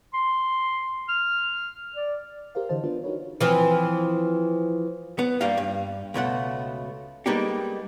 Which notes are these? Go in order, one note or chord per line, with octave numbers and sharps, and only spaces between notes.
C6
F6
D5
G4 A#4 C5 F5
D3 E3 C5 D#5 A5
B3 D4 F4 B4 C5
D#4 F#4 A#4 B4 C#5
E3 F3 C4
B3
G2 G3 A#3 F5
G2
C#2 B2 A3 F#5
G3 G#3 A#3 B3 D#4 G4